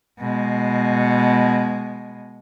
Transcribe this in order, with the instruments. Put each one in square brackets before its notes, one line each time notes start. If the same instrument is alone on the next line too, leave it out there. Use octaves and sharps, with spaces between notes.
[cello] B2 G#3